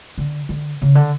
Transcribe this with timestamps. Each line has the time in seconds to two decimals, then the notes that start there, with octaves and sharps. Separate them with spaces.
0.18 D3
0.49 D3
0.82 C#3
0.95 D3